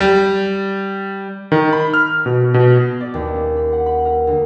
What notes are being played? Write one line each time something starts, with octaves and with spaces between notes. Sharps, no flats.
G3
D#3
B5
F6
B2
B2
D5
D#2
C#4
B5
F#5
B5
A#4
D2